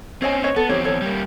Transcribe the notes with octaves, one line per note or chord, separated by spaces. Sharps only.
C4 C#4 C#5 D#5 G#5
B4 C#5 D#5
B3 A4
E2 C4 D#4 G4 C#5
A4 C#5
G3 A#3